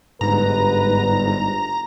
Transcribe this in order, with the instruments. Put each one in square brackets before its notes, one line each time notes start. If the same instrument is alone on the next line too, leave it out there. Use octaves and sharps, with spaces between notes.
[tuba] G1 [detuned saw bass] G#2 [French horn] B4 [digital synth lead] A#5